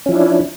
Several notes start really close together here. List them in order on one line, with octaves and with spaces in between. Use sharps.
C#4 F3 E4 D4